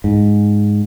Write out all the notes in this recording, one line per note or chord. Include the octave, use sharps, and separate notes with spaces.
G#2